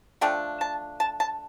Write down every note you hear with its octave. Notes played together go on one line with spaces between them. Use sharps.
D3 F3 A3 D4 G5
A5
A5
A5